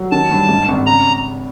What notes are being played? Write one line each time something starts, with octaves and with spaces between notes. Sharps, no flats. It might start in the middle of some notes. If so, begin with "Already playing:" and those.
Already playing: F#3
D#3 A5
G2
G#2
G#1
C#3 A#5